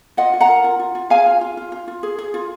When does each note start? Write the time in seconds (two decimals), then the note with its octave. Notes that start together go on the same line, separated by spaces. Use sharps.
0.17 F4 D#5 F#5
0.33 F4
0.40 F#5 A#5
0.48 A#4
0.64 F4
0.79 F4
0.95 F4
1.10 G#4 F5 G#5
1.26 F4
1.41 F4
1.57 F4
1.72 F4
1.88 F4
2.03 G#4
2.18 G#4
2.34 F4